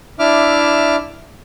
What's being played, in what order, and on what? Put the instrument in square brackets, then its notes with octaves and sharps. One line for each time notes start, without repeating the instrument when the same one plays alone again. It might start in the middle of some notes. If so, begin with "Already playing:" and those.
[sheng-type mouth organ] D4 E4 E5 D6 F6